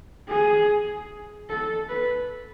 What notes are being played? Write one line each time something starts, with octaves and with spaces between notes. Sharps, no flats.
G#4
A4
B4